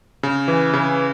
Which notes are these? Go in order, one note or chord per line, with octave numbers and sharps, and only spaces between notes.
C#3
E3
C#3